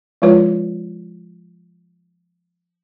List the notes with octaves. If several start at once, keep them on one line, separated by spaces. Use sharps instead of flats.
F3 G#3 E4 F4 B4 C#5